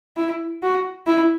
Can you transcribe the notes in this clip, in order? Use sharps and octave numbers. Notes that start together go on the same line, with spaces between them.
E4
F#4
E4